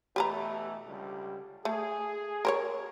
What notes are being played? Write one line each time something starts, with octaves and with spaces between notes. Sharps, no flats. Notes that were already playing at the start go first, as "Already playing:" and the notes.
B2 E3 A3 G4 B4 A#5
C#2 D3 G3
A3 G#4
A#4 C5 C#5